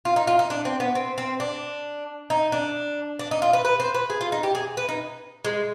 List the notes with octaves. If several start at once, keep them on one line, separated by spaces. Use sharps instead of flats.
F4
D#4
F4
D#4
D4
C4
B3
C4
C4
D4
D#4
D4
D4
D#4
F4
B4
B4
C5
B4
G#4
F4
D#4
G4
G#4
B4
D#4
G#3